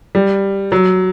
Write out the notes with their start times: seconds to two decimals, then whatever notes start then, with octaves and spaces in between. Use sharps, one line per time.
0.15 G3
0.72 F#3